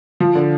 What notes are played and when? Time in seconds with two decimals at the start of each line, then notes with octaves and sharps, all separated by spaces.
0.20 F3
0.35 D3